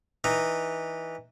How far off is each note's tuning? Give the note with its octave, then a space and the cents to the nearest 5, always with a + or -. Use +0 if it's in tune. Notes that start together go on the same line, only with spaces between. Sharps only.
E3 -15 D#4 -15